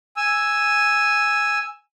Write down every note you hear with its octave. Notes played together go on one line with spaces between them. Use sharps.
G#5 E6